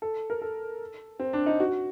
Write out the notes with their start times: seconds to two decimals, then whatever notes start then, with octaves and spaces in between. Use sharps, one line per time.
0.02 A4
0.30 A#4
0.42 A4
1.20 C4
1.33 D4
1.46 D#4
1.60 F#4